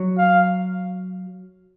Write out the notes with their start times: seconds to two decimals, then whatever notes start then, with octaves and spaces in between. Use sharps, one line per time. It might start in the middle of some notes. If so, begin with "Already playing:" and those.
Already playing: F#3
0.18 F5